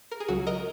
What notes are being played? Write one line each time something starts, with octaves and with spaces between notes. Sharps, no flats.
A#4
G#4
C#2 C#3 F#3 F#4
A#4 D#5